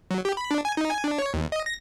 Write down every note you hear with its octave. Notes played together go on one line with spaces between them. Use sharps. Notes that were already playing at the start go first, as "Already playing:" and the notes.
F#3
G4
B5
D4
G#5
D#4
G#5
D4
C#5
D#2
D#5
A#6